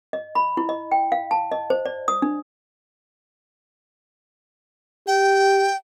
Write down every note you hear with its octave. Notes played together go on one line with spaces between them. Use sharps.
D#5
B5
E4
D#5
G5
F5
A5
D#5
C5
D5
D#6
D4
G4 G5